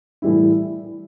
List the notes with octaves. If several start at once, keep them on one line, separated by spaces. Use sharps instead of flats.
A2 E3 G3 E4